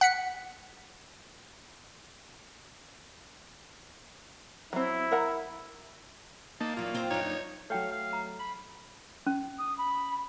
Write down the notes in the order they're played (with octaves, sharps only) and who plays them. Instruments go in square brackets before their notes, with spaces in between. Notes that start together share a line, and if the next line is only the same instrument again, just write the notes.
[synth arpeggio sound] F#5 B6 C#7
[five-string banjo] F#3 C4 [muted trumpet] E4
[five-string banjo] A#4 F#5 A#5
[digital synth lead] A#3 [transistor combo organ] D#4 A5
[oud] E2 F#3 [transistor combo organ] F4
[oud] C4 C5
[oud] F#2 D4 [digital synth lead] D#4 [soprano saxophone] C#5
[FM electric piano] F#3 A3 [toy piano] C#5 G5 [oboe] F5
[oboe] F5
[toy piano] A#5
[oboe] B5
[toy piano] C#4
[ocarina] D#6
B5